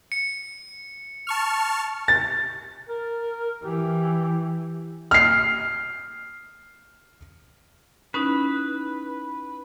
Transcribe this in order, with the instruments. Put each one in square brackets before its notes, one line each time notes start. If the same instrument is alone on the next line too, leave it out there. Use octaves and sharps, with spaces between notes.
[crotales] C#7
[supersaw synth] A5 C#6 F6
[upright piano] A6
[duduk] A#4
[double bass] E3 [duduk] G4
[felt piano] F6 C7
[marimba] C#4 D#4 E4 [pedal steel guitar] B4